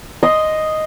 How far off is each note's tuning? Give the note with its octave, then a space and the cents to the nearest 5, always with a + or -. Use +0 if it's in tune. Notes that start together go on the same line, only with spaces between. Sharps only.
D#5 +0 C6 +0